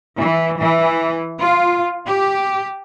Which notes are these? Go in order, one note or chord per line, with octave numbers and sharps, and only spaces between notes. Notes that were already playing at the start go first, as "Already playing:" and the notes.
E3
E3
F4
G4